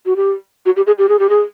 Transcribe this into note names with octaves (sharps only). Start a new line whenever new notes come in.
F#4
G4
F#4
G4
G#4
G4
G#4
G4
G#4